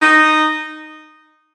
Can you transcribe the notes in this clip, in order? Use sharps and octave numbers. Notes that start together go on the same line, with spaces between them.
D#4